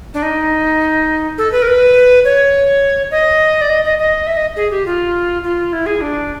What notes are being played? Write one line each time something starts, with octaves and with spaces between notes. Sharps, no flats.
D4
D#4
A4
B4
A#4
B4
C#5
D#5
D5
D#5
D#5
D#5
E5
D#5
G#4
G4
F4
F4
E4
G#4
D4